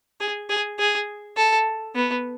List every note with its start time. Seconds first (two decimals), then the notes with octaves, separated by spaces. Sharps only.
0.21 G#4
0.50 G#4
0.79 G#4
1.37 A4
1.95 B3